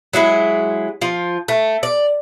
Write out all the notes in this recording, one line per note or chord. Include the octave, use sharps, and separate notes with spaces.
F#3 G#3 E4 G#4
F3 F4
A3
D5